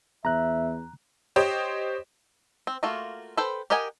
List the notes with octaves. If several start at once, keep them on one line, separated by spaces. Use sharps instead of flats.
E2 E5 A#5 F#6
G4 C5 C#5 D#5
C4
A3 A#3 F4 F#4
A4 B4 C5 G5
G4 A#4 D#5 F#5 G#5